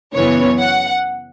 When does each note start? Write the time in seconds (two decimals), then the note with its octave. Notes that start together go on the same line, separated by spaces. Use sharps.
0.14 F#2 C#3 E3 B3 C#5
0.59 F#5